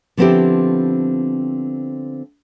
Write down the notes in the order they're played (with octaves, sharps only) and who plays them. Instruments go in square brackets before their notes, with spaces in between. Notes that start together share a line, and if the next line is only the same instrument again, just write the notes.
[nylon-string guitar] D3 F3 B3 C4 E4 G4